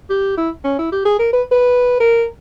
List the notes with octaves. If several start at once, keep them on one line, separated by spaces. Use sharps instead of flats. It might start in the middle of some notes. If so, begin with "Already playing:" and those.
G4
E4
C#4
E4
G4
G#4
A#4
B4
B4
A#4